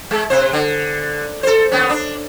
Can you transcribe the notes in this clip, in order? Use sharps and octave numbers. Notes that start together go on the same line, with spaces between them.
G#3
C3 C5
D3
A4 C5
D#2 B3 C#4
D4